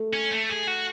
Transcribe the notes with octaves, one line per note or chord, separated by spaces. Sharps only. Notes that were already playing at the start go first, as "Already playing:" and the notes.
Already playing: A3
C#4
A3
G#4
F#4